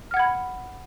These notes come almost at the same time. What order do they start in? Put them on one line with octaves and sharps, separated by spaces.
F6 F#5 G#6 B5